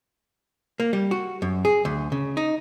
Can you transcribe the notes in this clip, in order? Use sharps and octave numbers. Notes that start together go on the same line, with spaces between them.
A#3
G3
F#4
F#2
G#4
D2
C#3
D#4